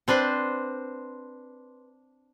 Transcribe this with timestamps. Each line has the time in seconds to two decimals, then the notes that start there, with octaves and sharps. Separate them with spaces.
0.08 C4 D4 B4 C5